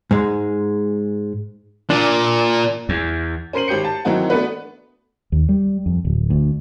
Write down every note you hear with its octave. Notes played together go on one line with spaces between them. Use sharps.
G#2 G#3
A#2 D4
E2
C#4 A#4 C5 C7 D#7 F#7
G#1 G4 G6 C#7
A5
D#3 E3 F#3 C4 D#4 F#4
A3 B3 D4 F#4 B4
D#2
G3
F2
D1
D2